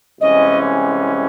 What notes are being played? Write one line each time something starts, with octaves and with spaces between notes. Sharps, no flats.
C2 C3 E3 G#3 C#4 D#5